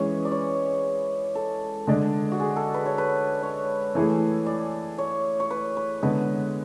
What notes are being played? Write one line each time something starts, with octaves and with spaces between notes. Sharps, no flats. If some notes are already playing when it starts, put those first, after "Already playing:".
Already playing: E3 G#3 C#4 G#4 B4 C#5
D5
C#5
A4
D3 G#3 D4
F#4
G#4
A4
B4
C#5
B4
C#5
E3 A3 E4 G#4
D5
C#5
C#5
B4
B4
D3 G#3 B3 B4